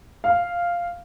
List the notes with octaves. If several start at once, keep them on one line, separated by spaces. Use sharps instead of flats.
F5